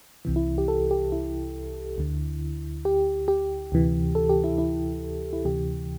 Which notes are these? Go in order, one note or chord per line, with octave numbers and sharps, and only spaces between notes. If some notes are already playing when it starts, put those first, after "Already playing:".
C2 C3 E3
E4
G4
A4
G4
E4
D2 D3
G4
G4
D2 C3 E3
A4
G4
E4
E4
E4
D2 C3 E3 G4